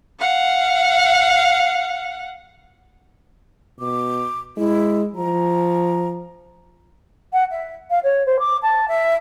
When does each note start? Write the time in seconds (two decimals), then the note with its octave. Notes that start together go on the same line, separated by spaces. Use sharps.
0.19 F5 F#5
3.80 B2 D6
4.57 G#3 E4
5.16 F3 A#5
7.33 F#5
7.51 E5
7.90 F5
8.03 C#5
8.26 C5
8.39 D6
8.62 A5
8.88 E5